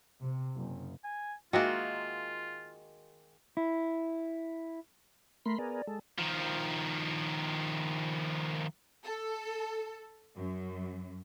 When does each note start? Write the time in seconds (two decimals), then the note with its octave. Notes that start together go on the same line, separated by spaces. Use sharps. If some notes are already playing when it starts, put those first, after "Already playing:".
0.21 C3
0.56 F#1
1.04 G#5
1.53 D#3 G#3 A#3 F4 F#4 D#5 E5
3.57 E4
5.45 A3 A#4 B5 C6
5.59 B3 G#4 A#4 D5
5.87 G#3 A4
6.18 D#3 F3
9.03 A4
10.37 F#2